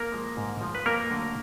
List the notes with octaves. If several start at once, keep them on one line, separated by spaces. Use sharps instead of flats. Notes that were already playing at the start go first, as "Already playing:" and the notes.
Already playing: A#3 A#4
F3 G#3
G#2
F3 G#3
B4
F2 A#3 A#4
D3 F#3 A3